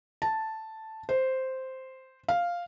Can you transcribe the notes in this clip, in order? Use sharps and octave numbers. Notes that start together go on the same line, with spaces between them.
A5
C5
F5